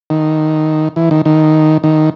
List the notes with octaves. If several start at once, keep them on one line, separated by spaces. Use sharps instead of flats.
D#3
E3
D#3
D#3
D#3